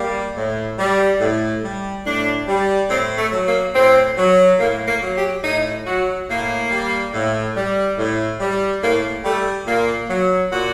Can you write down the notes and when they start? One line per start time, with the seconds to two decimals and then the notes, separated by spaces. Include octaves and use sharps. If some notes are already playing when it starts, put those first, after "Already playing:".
Already playing: G3 A#3
0.36 A2
0.79 G3
1.21 A2
1.63 G3
2.06 A2 D4
2.48 G3
2.90 A2 C4
3.18 A3
3.32 F#3
3.46 A#3
3.74 A2 C4
4.17 F#3
4.59 A2 A#3
4.87 A#3
5.01 F#3
5.16 G4
5.44 A2 D#4
5.86 F#3 F#4
6.29 A2 A#3
6.71 G3
7.13 A2
7.56 G3
7.98 A2
8.40 G3
8.82 A2 A#3
9.25 G3 A3
9.67 A#2 A#3
10.09 F#3
10.52 A#2 F#4